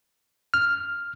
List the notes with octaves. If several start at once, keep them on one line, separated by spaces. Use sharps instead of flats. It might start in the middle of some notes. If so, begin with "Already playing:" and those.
F6